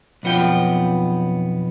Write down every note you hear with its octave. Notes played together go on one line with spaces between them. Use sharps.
B1 F2 B3 F4 G5